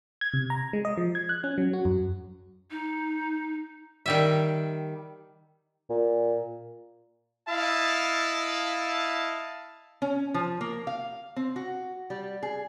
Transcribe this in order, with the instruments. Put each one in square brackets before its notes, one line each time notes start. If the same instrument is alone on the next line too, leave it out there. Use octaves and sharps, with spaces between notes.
[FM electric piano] G#6
C3
A#5
G#3
D#5
F3
G#6
F#6
C#4
F#3
F#4
F#2
[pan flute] D#4
[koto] D#3 G3 E5
[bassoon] A#2
[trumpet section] E4 D#5 F5 A5
[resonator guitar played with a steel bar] C#4
F3
A#3
F5
C4
F#4
G3
G#4